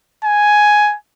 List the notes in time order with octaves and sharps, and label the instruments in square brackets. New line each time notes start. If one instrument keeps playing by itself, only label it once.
[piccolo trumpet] G#5